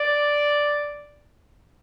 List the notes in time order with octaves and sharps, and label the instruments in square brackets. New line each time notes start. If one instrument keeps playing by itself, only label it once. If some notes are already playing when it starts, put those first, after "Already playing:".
Already playing: [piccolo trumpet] D5